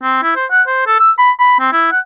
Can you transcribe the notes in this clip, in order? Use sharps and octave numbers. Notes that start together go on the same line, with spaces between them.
C4
E4
C5
F#5
C5
A4
E6
B5
B5
C4
E4
F#5